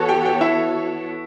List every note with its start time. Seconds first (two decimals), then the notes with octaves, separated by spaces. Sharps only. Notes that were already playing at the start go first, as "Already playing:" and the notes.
Already playing: E3 B3 F#4 A4 C#5
0.08 G4 G5
0.25 G4 G5
0.41 E4 E5